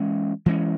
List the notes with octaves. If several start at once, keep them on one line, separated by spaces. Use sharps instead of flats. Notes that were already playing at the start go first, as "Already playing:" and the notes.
Already playing: E3 G#3 C#4
E3 G#3 C#4